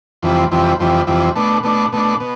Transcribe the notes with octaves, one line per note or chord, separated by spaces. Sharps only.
F2 C3 E3 G3
F2 C3 E3 G3
F2 C3 E3 G3
F2 C3 E3 G3
B2 A3 D4
B2 A3 D4
B2 A3 D4
B2